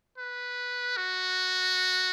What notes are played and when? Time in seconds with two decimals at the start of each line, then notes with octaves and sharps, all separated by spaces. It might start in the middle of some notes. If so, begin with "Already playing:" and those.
0.18 B4
0.97 F#4